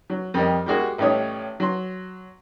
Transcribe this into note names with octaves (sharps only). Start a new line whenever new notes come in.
F#3
F2 G3 A#4 D#5
G3 G#3 A#3 F#4 G#4
A1 G3 A3 D#4 C#5 D#6
F#3 C6